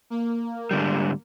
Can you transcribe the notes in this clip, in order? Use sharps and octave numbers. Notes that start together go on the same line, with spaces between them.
A#3
G#2 D3 G3